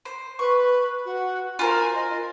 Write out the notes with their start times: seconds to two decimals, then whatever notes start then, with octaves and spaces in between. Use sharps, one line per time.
0.05 C5
0.39 B4 C#6
1.05 F#4
1.59 F4 A#4 C5 G#5
1.95 D#5